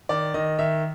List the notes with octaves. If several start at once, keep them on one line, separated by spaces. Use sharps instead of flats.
D#3 D5
D#3 D#5
D#3 E5